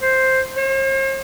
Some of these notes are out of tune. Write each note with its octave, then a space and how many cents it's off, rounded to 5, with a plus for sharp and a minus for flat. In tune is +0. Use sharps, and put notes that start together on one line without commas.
C5 +5
C5 +45